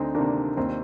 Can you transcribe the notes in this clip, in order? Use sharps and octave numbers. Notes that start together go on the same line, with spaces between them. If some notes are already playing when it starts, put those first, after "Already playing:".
Already playing: D2 C4 D#4
C3 D#3 A#3 D4
D#2 C4